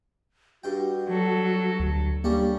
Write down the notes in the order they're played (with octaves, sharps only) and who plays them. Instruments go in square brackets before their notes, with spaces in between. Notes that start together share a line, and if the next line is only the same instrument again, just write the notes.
[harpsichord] G2 G5 [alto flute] F#4
[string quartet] F#3 A4
[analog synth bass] D2
[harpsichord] G3 C#4 D4 [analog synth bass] A#3